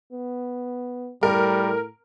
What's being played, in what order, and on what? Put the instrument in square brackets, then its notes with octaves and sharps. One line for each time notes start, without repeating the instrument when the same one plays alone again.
[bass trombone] B3
[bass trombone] A2 [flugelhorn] G3 [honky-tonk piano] A#4